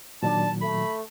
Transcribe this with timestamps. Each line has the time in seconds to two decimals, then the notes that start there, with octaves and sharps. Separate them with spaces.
0.23 A#2 D#3 F#3 D4 A5
0.61 A3 B5